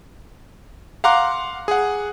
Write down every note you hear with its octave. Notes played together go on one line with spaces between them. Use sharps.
F5 F#5 A#5 C6 D6 F#6
G#4 F#5